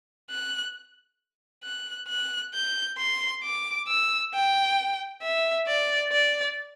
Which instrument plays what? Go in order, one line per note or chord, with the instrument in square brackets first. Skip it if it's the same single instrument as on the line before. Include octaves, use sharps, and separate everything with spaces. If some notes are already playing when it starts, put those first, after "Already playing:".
[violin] F#6
F#6
F#6
G6
C6
D6
E6
G5
E5
D5
D5